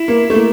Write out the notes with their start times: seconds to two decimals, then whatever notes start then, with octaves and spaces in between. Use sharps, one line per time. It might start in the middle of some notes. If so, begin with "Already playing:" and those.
Already playing: E4
0.08 A#3
0.30 A3
0.35 A#3